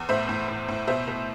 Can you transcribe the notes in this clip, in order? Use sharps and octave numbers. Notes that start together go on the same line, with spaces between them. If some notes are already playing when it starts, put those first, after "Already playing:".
Already playing: E2
A2 C5 E5
A2
A2
A2
B2 C5 E5
B2